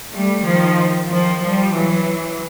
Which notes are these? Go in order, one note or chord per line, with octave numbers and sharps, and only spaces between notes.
G3 A3
D#3 F3
D#3 F3
F3 G3
E3 F#3